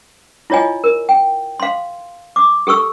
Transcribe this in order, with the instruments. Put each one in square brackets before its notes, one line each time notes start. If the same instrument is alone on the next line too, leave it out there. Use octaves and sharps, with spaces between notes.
[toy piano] E4 F4 C#5 D#5 G#5
A#4
G5
F5 C6
D6
G4 A4 C#6 E6